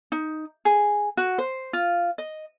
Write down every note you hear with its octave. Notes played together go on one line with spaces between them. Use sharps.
D#4
G#4
F#4
C5
F4
D#5